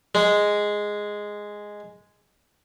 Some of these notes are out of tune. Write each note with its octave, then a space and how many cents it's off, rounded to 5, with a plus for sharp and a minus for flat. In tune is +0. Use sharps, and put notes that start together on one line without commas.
G#3 +0